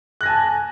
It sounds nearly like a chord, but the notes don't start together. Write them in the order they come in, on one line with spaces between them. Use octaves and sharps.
F#6 A#6 G#5 A5